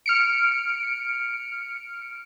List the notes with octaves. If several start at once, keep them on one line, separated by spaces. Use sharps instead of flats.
F6 C#7 D7